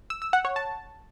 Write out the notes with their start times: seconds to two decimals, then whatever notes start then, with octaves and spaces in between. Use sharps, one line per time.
0.10 E6
0.22 E6
0.33 F#5
0.45 C#5
0.56 A5